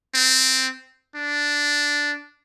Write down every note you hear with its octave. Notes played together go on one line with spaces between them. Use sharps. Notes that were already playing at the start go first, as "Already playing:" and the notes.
C4
D4